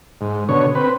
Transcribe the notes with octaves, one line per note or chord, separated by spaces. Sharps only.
G#2
B2 D3 C#5
C4 B4